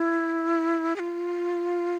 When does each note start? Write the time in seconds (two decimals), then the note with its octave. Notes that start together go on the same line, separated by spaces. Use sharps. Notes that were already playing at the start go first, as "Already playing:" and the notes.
Already playing: E4
0.96 G#4
0.99 F4